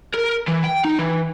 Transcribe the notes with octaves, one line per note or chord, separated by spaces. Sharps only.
A#4
E3
G5
D#4
E3